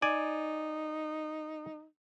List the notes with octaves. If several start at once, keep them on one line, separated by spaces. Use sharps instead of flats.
D#4 D5 G#5